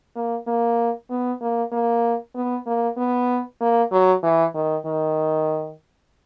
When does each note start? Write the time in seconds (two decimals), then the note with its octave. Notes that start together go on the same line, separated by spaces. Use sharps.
0.16 A#3
0.47 A#3
1.10 B3
1.41 A#3
1.72 A#3
2.35 B3
2.66 A#3
2.97 B3
3.61 A#3
3.91 F#3
4.23 E3
4.55 D#3
4.86 D#3